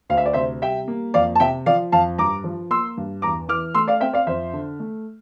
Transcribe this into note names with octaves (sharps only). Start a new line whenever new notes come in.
D2 F5
E5
D5
C3 C5 E5
G3 E5 G5
A#3
F2 D5 F5
A5
C3 E5 G5
F3 D5 F5
F2 F5 A5
G2 A#5 D6
F3
A#3 C6 E6
G2
E2 A#5 D6
E3 D6 F6
A3 C6 E6
D5 F5
C4 E5 G5
D5 F5
F2 C5 E5
D3
A3